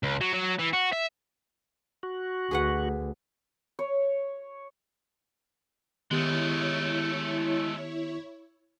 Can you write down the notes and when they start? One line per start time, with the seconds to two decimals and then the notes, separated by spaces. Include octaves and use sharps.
0.03 C#2
0.21 F#3
0.34 F#3
0.59 E3
0.73 F#4
0.93 E5
2.03 F#4
2.51 D2 G#4 B4 F#5
3.79 C#5
6.11 D#3 G#3 A3 B3 E4 G4 C#5